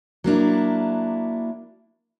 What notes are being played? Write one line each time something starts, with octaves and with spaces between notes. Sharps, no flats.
F#3 A#3 D4 E4